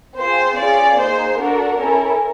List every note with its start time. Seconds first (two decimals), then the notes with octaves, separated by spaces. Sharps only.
0.18 C4 F4 G#4 C5
0.58 C#4 F4 G#4 D5
0.99 A#3 D#4 G#4 C5
1.39 D4 F#4 A4 A#4
1.79 C#4 E4 A4